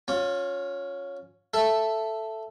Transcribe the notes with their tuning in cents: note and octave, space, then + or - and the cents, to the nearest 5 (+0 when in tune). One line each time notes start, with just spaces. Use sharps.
C#4 +0 F4 +30
A4 +0 E5 +10